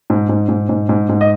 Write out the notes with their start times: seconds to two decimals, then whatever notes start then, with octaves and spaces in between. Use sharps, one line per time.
0.10 G#2
0.29 G#2
0.49 G#2
0.69 G#2
0.89 G#2
1.09 G#2
1.21 D#5